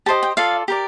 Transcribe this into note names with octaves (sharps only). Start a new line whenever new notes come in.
G4 C5 D#5 A5
G5
F4 A4 D5 F5
G4 A#4 D5